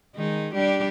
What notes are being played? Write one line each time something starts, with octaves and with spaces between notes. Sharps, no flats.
D#3 G#3 D#4
G3 D4 G4